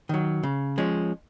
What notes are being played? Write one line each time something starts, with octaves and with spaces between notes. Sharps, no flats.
D#3 F#3
C#3
F3 G#3 C#4